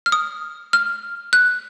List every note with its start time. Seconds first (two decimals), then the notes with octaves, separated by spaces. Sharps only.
0.06 F6
0.12 D#6
0.73 F6
1.33 F#6